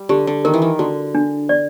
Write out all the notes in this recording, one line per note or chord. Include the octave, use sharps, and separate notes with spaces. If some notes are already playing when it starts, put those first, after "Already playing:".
Already playing: G3
D3 G4
D3
D#3 A#4
E3
D#3
D3 F#4
D4
D5